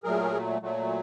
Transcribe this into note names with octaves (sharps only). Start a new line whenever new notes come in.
A#2 F#3 A3 G#4 A#4
A#2 F#3 A3